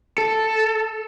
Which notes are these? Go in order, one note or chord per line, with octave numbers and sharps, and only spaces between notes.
A4